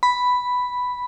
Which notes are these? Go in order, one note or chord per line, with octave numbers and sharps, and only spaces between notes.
B5